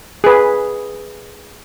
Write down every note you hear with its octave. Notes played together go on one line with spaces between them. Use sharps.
G#4 B4